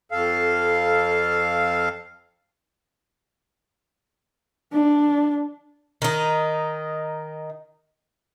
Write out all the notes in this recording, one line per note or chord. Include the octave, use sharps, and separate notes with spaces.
F2 A4 F5
D4
D#3 D#4